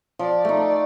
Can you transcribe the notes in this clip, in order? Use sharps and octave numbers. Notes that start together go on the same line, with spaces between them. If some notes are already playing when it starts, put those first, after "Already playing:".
F3 D5
A3 D#4